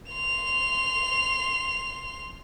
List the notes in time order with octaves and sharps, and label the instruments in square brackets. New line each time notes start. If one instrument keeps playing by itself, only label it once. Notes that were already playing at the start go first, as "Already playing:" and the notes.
[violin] C6 F7